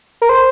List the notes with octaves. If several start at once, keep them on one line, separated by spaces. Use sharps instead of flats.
A#4
C5